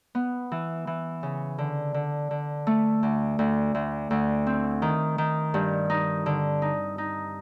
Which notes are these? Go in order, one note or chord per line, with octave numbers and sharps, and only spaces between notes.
B3
E3
E3
C#3
D3
D3
D3
A3
D2
D2
D2
D2
C4
D#3
D#3
G2
D#4
D3
D#4
D#4